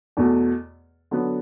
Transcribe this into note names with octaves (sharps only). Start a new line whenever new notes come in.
E2 B2 A3
D3 F#3 B3